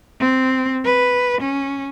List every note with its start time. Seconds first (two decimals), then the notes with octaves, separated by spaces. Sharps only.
0.20 C4
0.85 B4
1.41 C#4